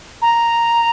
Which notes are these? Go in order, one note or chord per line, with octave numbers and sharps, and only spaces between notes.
A#5